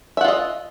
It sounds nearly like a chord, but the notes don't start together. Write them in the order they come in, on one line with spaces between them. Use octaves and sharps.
E5 F#5 F4 D#5